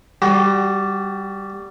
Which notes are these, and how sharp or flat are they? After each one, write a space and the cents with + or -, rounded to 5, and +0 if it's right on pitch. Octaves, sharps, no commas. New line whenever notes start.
G3 +0 F#4 +25